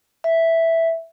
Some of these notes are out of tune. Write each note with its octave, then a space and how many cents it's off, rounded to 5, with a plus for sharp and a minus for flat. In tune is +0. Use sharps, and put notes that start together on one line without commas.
E5 +0